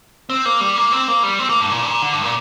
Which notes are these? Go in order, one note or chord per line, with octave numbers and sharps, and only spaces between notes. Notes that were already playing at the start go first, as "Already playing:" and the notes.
C4
A#3
G3
A#3
C4
A#3
G3
C4
A#3
G2
A#2
G2
A#2
D3
G2
A#2